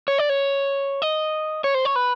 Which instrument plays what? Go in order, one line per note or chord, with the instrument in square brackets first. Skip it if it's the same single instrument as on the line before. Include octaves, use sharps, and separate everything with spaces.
[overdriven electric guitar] C#5
D5
C#5
D#5
C#5
C5
C#5
B4